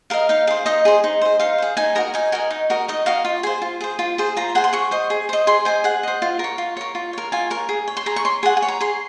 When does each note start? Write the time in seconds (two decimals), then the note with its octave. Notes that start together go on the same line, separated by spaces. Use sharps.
0.10 A#4 D#5 F5
0.29 D#4 F5
0.47 G#4 C5 F5
0.66 D#4 D#5
0.85 G#4 C5
1.04 D#4
1.21 G#4 C5
1.39 D#4 F5
1.58 G#4 C5
1.77 D#4 G#5
1.95 F#4 A#4 D#5 A#5
2.14 D#4 G#5
2.32 F#4 A#4 D#5 G#5
2.51 D#4
2.70 F#4 A#4 D#5
2.88 D#4 D#5
3.06 F#4 A#4 D#5 F5
3.25 F4
3.43 G#4 C5 G#5
3.62 F4
3.81 G#4 C5
3.99 F4
4.18 G#4 C5
4.37 F4 A#5
4.55 G#4 C5 F#5
4.64 C6
4.73 G#4 C#6
4.91 C5 D#5
5.10 G#4
5.29 C5 D#5
5.47 G#4 C6
5.65 C5 D#5 G#5
5.84 G#4 F#5
6.03 C5 D#5
6.22 F4
6.39 A#4 C#5
6.58 F4
6.77 A#4 C#5
6.95 F4
7.13 A#4 C#5
7.32 F4 G#5
7.50 A#4 C#5
7.69 G#4
7.88 C#5
7.97 C6
8.06 G#4 A#5
8.16 C#6
8.25 C#5 C6
8.43 G#4 F#5
8.57 G#5
8.62 C#5
8.68 A#5
8.81 G#4 C6